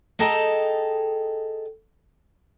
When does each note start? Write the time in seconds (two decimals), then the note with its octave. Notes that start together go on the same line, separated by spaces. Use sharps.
0.19 G#4 A4 D#5 G5 A5 A#5